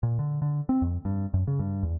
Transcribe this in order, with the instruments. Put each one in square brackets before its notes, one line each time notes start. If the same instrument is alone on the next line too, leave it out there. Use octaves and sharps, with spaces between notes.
[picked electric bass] A#2
D3
D3
C4
F2
G2
F#2
C#3
G2
E2